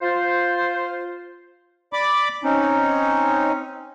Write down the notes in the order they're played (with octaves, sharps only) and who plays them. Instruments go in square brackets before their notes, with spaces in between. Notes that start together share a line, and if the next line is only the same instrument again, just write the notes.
[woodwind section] F4 C5
[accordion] D5 B5 D6
C4 C#4 D#4